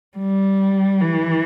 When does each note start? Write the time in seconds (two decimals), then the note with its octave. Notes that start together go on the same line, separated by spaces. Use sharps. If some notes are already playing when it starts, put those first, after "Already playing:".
0.18 G3
1.01 E3